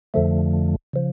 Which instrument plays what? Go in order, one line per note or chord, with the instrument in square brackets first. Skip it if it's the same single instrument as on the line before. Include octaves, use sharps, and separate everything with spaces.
[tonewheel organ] F2 D3 F3 A3
C#3 F3